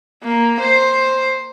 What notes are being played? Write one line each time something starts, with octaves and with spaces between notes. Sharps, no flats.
A#3
C5